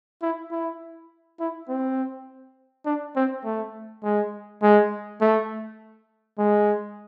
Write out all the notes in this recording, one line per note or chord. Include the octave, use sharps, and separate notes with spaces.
E4
E4
E4
C4
D4
C4
A3
G#3
G#3
A3
G#3